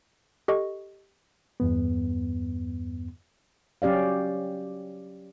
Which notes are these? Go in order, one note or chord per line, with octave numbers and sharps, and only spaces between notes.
G4 A4 D#5 C#6
E2 G2 B3
F#3 C#4 G4 D5 F5